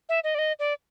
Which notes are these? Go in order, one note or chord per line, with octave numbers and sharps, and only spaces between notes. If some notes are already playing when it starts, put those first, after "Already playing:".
E5
D#5
D5
D#5
D5